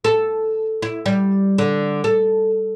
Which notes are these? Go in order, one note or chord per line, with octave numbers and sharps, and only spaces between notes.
A4
E4
G3
D3
A4